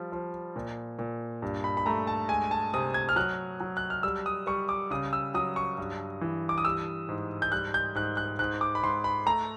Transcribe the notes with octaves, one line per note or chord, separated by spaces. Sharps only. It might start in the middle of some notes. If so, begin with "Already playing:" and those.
Already playing: F3 G3
F3
A#2
A#2
G2
B5
B5
A3 A#5
A5
G#3 G#5
A5
C3 D#6
G#6
F6
F#3 F#6
F#3
F#6
F6
G3 E6
D#6
G3 C#6
D6
C#3 D#6
E6
F#3 D#6
C#6
G2
E3
D6
D#6
G3 E6
G#2
G6
G3 F#6
G6
G#2 F#6
F#6
G#2 F#6
D6
B5
G#2 C6
B5
A3 A#5